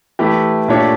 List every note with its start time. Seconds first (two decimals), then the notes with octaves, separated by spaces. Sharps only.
0.19 E3 A3 E4 G4
0.68 A#2 A3 D4 G4 C#5